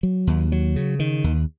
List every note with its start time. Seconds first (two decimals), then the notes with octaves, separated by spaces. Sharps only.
0.03 F#3
0.27 D#2
0.52 F#3
0.76 C#3
0.99 D#3
1.24 D#2